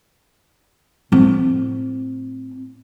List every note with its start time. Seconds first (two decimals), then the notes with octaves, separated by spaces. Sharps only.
1.12 A2 C4